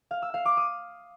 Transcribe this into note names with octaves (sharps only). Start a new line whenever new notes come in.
F5
E6
F5
D6
D#6